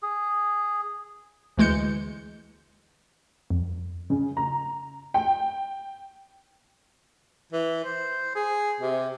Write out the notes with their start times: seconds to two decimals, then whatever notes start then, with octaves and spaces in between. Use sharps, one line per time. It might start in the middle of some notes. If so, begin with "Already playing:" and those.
0.03 G#4
1.57 D2 E3 G#3 G6 C#7
3.50 F2
4.10 C#3
4.37 A#5
5.14 G5
7.53 E3
7.84 C5
8.35 G#4
8.81 C3